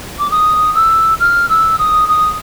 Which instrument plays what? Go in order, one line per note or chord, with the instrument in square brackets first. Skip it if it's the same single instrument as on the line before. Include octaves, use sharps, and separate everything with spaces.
[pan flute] D6
D#6
E6
F6
E6
D#6
D#6